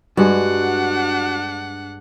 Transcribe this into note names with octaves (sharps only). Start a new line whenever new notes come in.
G2 G#3 D4 F#4 F#5